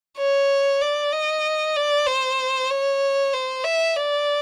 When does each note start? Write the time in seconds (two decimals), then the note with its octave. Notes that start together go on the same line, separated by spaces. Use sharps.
0.18 C#5
0.81 D5
1.12 D#5
1.76 D5
2.07 C5
2.70 C#5
3.33 C5
3.64 E5
3.96 D5